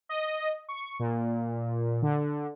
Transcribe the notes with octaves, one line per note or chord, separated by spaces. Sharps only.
D#5
C#6
A#2
D3